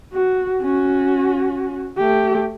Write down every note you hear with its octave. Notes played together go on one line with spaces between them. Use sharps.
F#4
C#4 F#4
A3 G4